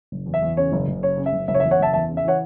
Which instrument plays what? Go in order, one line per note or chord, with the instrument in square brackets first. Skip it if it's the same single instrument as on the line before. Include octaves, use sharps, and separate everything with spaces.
[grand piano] F#1
E2
E5
E2
C#3 C#5
F#1
F#1
C#3 C#5
C#3
E5
F#1
F#1 E5
C#5
E2 E5
C#5 F#5
F#1 E5 A5
E2 E5 A5
C#3
E5
E3 C#5 F#5